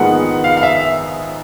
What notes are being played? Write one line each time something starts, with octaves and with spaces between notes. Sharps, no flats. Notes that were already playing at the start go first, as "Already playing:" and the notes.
Already playing: A#1 G#2 D#3 G#3 B3 F#5
F5
F5
E5